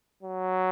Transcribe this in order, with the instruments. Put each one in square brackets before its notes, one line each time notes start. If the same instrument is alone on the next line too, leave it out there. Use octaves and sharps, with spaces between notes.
[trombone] F#3